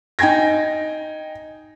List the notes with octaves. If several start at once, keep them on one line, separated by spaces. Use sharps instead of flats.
D#4 G5 G#5 G#6 A#6